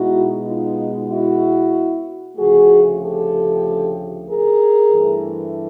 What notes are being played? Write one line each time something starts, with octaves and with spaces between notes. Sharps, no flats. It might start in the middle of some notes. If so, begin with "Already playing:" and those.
Already playing: B2 G#3 B3 D#4 E4 F#4
D#4 F4
E4 F#4
D2 C#3 F3 A3 F#4 G#4
G4 A4
G#4 A#4
G2 E3 A3